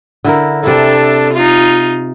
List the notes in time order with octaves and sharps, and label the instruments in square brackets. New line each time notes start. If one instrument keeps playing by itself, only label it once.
[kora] D3 E4 A#4
[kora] C3 E4 [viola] D4 A4
[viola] D#4 F4